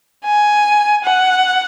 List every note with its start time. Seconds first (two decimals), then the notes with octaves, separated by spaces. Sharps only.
0.25 G#5
1.04 F#5